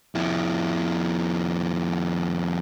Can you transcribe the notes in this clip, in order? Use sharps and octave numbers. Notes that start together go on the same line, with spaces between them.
F2 E4